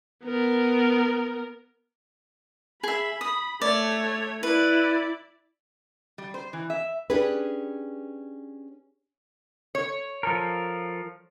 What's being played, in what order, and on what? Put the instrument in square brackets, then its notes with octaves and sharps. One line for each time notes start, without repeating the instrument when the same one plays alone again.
[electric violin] B3 A#4
[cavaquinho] G#4 E5 [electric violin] B5
[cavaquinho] D#6
[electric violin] A3 C#5 [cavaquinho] D5
[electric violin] E4 D5 [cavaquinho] B4
[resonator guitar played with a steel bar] G3
C5
E3
E5
[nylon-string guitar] C#4 D4 G4 G#4 B4
[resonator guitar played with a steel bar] C#5
[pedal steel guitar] F3 A4 A#4